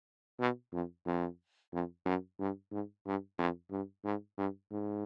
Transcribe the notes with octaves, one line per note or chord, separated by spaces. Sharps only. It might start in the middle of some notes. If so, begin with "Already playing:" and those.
B2
F2
F2
F2
F#2
G2
G#2
G2
F2
G2
G#2
G2
G#2